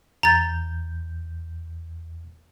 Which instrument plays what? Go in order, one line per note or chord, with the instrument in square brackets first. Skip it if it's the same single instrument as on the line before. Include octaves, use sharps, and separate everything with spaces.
[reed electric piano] E2 G6 [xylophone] A#5 A6